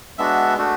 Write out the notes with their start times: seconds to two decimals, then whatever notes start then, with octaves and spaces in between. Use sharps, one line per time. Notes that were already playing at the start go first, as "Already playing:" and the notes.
0.18 G#3 B3 D4 F#4 E5
0.58 A3 D4 F#4